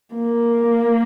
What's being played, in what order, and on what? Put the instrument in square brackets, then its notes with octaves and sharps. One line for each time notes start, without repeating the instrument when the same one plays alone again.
[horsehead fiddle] A#3